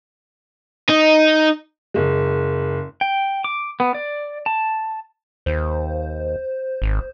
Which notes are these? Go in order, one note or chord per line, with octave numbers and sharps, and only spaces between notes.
D#4
F#1 G#3
G5
D6
B3
D5
A5
D#2 C5
G#1